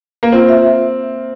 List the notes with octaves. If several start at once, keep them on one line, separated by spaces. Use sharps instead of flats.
A#3
C4 F4
E5